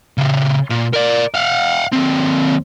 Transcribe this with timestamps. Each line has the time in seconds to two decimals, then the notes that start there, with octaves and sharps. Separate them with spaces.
0.18 C#3 G4
0.71 A#2
0.94 A#4 D5
1.35 F5 F#5
1.92 D#2 C4